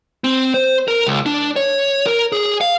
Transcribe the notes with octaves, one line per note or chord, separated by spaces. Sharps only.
C4
C5
A#4
C#2
D4
C#5
A#4
G#4
F5